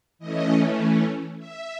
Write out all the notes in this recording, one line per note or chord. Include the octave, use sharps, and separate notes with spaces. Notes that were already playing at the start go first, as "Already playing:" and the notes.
E3 A3 C#4 D#5
E5